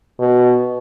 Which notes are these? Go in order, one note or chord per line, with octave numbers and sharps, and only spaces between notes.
B2